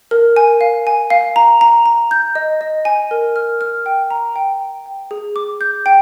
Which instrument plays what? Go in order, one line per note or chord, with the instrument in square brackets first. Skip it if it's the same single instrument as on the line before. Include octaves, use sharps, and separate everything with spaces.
[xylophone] A#4
G#5
F5
G#5
F5
A#5
A#5
A#5
G6
D#5
D#5
G#5
A#4
F6
F6
G5
A#5
G5
G5
G5
G#4
D6
G6
G5